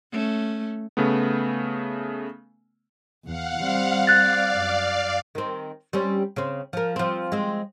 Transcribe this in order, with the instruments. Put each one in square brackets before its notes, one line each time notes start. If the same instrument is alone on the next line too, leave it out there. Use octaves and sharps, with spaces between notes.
[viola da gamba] A3 C#4
[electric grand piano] C#3 A3 B3
[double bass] E2 [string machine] F5 F#5
[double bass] G3 C4
[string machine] D5 F5 [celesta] F#6 A6
[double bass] F#2
[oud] D#3 C4
G3 C4 C#4
C#3 C4
F3 A#4
F3 C4
G#3 C4